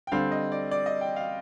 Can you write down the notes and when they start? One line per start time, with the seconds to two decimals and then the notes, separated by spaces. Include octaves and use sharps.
0.07 G5
0.12 D3 G3 C4 F5
0.31 D#5
0.52 D5
0.71 D5
0.86 D#5
1.01 G5
1.16 F5